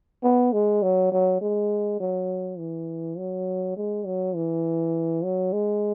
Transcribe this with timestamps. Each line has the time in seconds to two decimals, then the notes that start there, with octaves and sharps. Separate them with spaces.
0.23 B3
0.53 G#3
0.83 F#3
1.12 F#3
1.41 G#3
2.00 F#3
2.59 E3
3.18 F#3
3.77 G#3
4.06 F#3
4.36 E3
5.24 F#3
5.53 G#3